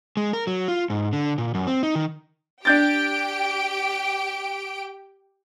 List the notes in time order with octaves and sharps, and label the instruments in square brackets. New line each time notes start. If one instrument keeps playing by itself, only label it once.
[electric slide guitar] G#3
A#4
F#3
F4
G#2
D3
A#2
F#2
C4
D#4
D#3
[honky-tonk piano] D4 G6 A6 [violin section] G4 G5 D7